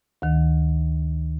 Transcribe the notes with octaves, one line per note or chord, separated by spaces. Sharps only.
D2 D#3